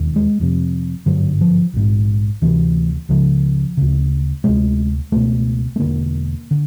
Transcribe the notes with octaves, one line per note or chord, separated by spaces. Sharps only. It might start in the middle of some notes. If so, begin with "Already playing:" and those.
Already playing: E1 D#2
G#3
F1 F2 C3
G#1 G2 D3 F#3
F3
A#1 G#2
D2 C3 E3
C#2 C#3 F3
D2 C#3
D2 C3 G#3
C#2 B2 A3
A3
E1 D#2 D3 A#3
D3